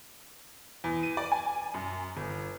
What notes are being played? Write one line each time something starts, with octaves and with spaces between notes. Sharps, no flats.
E2
D#7
D5
G#5
F#2
G1